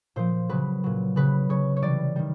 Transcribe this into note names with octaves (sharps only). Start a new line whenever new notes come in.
A#2 F3 C5
C#3 F#3 B4
A#2 F#3
C#3 F#3 B4
C#3 F#3 C#5
C#5
C3 E3 G3 D5
D#3 G3